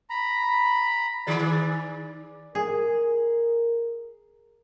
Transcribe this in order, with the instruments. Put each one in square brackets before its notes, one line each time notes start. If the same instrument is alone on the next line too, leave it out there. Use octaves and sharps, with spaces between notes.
[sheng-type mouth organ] A#5 B5
[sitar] D#3 G#4 D5
[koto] G#4 [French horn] A#4